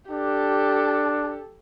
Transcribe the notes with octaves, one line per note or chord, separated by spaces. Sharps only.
D4 G4 A4